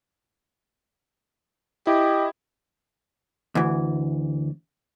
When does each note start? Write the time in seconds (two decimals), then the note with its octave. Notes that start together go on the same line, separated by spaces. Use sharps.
1.87 E4 G4 D#5
3.55 D2 E3